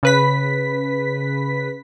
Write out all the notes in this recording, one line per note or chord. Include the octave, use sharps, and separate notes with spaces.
C#3 B4 B6